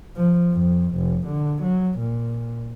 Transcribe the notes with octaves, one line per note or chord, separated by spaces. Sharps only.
F3
F2
F1
D3
F#3
A#2